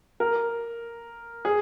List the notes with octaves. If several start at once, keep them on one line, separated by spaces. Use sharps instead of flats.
A#4
G#4